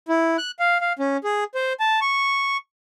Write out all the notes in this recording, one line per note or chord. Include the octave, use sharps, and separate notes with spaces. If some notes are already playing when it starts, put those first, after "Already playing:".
E4
F#6
F5
F5
C#4
G#4
C5
A5
C#6